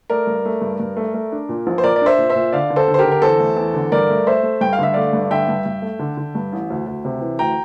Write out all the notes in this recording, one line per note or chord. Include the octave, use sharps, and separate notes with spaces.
A3 A#4 D5
G2
A3
G2
G2
A3
A3
D4
A#2
A#1
C5
A#2 A#4 D5
D5
D4 C5 E5
A#2
C5 E5
A#2
D3 D5 F5
D3
A4 C5
D3
C5
G4 A#4
D3
A#4
E2 A4 C5
A3
E2
D3
G2 A#4 D5
A3
A3 C5 E5
A3
G2 G5
F5
D3 E5
A3 D5 F5
G2
D3 E5 G5
G2
G2
A3
D3
D3
G2
A1
D2
D2
C3
E3
D2 G5 A#5